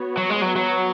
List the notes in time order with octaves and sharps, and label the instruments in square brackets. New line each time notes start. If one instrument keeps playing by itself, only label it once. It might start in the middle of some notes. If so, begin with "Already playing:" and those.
Already playing: [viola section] B3 F#4 C#5
[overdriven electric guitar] F#3
G#3
F#3
F#3